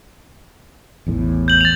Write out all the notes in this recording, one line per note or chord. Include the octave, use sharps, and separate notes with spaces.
A1 E2 A2
G6 F#7
A6 F7